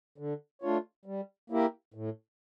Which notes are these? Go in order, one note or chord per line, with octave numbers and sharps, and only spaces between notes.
D3
A3 D4 F4 C#5
G3
A#3 E4 G4 A#4
A2